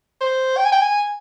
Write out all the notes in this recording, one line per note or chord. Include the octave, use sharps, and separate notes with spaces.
C5
G5
G#5
G5
G#5